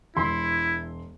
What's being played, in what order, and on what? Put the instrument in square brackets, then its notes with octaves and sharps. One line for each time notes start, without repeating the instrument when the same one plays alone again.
[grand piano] E1 C6 [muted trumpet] E4